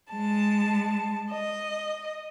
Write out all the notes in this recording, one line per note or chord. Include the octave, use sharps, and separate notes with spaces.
G#3 A5
D#5